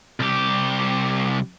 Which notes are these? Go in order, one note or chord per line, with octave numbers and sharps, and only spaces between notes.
C2 G4